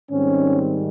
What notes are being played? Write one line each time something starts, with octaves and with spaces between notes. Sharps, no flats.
G#2 D#3 G3 C4 C#4